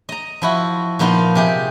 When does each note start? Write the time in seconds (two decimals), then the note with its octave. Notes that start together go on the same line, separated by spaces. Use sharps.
0.09 D#5 A#5
0.42 F3 E4 F#4
0.99 A#2 F3 B3 D#4 F4
1.35 C3 G4 G#4